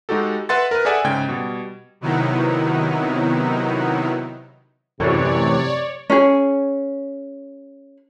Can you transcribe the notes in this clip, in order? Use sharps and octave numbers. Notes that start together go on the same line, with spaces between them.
G#3 D#4 F#4 G4 A4
B4 E5 F#5 C6 A6
A#4 B4
G#4 A4 D5 E5 F#5 G#5
G#2 C#3 G5 G#6
B2 G3
C3 D#3 F#3 B3 D#4 E4
F#2 A2 C3 E3 C#5 D5
C#4 G#4